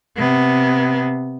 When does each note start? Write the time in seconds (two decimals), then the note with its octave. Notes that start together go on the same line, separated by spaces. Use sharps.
0.17 C3 B3